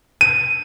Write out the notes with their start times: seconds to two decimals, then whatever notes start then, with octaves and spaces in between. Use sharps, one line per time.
0.21 D#7